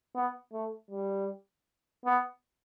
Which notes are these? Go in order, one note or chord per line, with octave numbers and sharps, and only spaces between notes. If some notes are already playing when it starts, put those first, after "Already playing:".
B3
A3
G3
B3